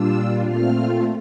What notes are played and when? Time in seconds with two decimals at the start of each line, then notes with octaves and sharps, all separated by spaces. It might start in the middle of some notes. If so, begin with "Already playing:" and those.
Already playing: A#2 G3 D4 F4 E6
0.46 A#2 A3 C4 F4 F6